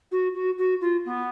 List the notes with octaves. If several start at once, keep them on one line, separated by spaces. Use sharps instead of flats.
F#4
F#4
F#4
F4
B3